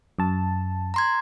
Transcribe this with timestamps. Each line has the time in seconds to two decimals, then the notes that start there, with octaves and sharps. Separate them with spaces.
0.19 F#2 A5
0.94 A#5 C6 G#6